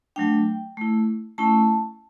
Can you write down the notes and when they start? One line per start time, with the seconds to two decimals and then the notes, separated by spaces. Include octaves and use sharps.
0.16 F#3 A3 D4 G5
0.77 A3 E4
1.38 A3 C#4 E4 A5